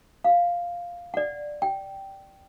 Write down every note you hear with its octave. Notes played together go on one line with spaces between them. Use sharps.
F5
D5 F#5
G5